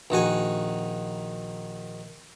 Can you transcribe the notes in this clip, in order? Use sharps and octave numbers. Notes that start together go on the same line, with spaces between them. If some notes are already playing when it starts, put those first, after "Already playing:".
A#1 D#3 F#4 G#5